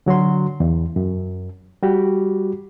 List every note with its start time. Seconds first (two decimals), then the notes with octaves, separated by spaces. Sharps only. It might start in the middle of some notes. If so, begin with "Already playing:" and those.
0.06 D3 F#3 F#4 C6
0.60 E2
0.96 F#2
1.83 G3 F#4 G4